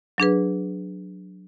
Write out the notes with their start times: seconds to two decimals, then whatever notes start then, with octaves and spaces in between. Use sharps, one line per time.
0.18 F#3 D4 G#4 B4